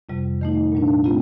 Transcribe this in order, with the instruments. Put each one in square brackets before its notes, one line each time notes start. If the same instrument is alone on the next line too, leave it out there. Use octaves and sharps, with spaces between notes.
[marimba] F2 C3 G3
D#3 A3 D#4
A#2 G3 D4
A3 C4 F4